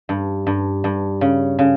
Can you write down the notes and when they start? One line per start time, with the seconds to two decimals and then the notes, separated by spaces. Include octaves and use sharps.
0.09 G2
0.47 G2
0.84 G2
1.21 C#3
1.59 C#3